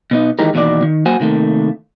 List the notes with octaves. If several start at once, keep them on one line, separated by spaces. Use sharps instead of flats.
B2 B3 D#4
D#3 E3 G#3 D#4 G4 A#4
E2 B2 D#3 A#3 D5
D#3
F#3 A#3 F#4 C5 F#5 G#5
C3 D#3 A3 A#3